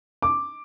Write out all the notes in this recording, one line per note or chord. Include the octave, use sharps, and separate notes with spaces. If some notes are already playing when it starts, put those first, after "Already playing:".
D6